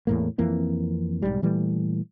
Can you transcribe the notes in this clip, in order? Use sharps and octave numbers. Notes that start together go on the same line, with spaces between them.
E2 A2 A#3
F2 E3 A#3 C4
B1 E2 G#2 G3
A#2 E3 G3 A3